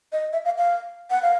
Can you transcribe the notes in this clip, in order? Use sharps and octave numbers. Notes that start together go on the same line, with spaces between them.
D#5
E5
F5
F5
F#5
F5